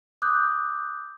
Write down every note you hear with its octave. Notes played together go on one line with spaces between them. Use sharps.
D6 D#6 F#6 G6